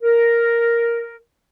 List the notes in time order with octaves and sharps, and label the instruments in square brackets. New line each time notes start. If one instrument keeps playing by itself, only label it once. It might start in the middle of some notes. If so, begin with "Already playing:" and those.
[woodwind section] A#4